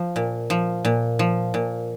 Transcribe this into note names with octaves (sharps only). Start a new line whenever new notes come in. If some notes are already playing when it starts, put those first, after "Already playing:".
Already playing: F3
A#2
F3
A#2
F3
A#2